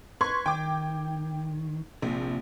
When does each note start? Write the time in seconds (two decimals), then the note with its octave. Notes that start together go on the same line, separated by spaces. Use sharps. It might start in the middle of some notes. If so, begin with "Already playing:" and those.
0.21 B4 C6 C#6 G#6
0.46 D#3 G5 D6
2.02 A#1 C3 F3